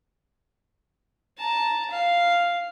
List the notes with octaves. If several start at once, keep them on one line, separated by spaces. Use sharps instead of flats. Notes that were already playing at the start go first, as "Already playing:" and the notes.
A5 A#5
F5